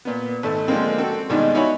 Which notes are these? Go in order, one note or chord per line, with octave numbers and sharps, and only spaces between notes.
A#2 B3
G#1 A3 A5 E6
D3 F3 G#3 A#3 C4
C4 F#4 A4
G2 B2 D#3 G#3 D4 D#4
D#4 E4 F#4 C#5 G#5 B5